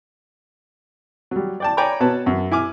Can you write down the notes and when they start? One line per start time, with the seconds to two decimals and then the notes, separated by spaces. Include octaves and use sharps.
1.31 F#3 G3
1.60 D5 G5 A5
1.77 C#5 D5 G5 G#5 A#5 B5
2.00 B2 B4 C#5 A5
2.26 F#2
2.51 E4 G#5 D6 F6